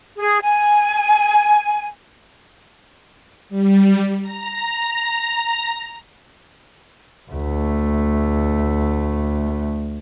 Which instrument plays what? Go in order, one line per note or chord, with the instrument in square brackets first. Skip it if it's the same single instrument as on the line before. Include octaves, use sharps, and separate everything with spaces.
[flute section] G#4
G#5
[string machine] G3
A#5
[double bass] D2 A3